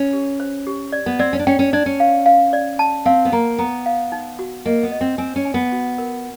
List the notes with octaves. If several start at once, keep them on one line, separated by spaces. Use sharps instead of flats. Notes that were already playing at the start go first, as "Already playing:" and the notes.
Already playing: C#4
G4
C5
G4
D5
B3
C4 D5
C#4
D4
C#4 G5
C#4
D4 D5
C#4
F5
F5
D5
A5
C4 F5
B3
A#3 A#5
B3 A#5
F5
D#4
F#4
A#3 D#5
B3
D#5
C4
C4 G#5
C#4
G#5
B3
F#4
A#4